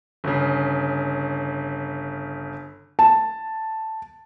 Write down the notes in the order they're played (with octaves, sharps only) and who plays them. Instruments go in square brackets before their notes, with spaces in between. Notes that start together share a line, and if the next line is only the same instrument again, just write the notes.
[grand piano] G1 C#3
[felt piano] A5